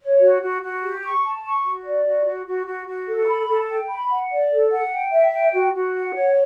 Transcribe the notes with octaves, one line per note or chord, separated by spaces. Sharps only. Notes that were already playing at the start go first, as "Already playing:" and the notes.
C#5
F#4
F#4
F#4
G4
C#6
A5
C#6
F#4
D5
F#4
F#4
F#4
F#4
F#4
A4
B5
A4
G5
B5
F#5
D5
A4
F#5
G5
E5
G5
F#4
F#4
F#5
C#5